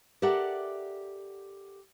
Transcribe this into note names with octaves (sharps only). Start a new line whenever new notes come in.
G4 A4 A#4 D5 E5 F#5